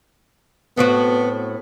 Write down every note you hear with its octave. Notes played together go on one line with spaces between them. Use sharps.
A2 B3 C4 F#4